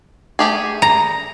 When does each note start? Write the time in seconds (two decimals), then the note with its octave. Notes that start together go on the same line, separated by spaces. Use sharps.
0.39 A3 G4 G#4
0.82 A#5